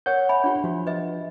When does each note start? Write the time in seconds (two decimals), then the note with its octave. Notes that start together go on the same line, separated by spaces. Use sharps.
0.06 A#4 C#5 F#5 G6
0.29 E5 G#5 B5
0.44 D4 F4 G4
0.64 F3 F4 F#4
0.87 B4 D#5 E5